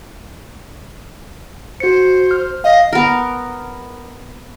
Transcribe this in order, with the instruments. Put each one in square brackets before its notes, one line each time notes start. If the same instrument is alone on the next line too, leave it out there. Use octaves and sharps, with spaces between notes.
[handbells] F#4 C#7 [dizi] C5
[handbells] F6
[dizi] D#5 [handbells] F5
[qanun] B3 A#4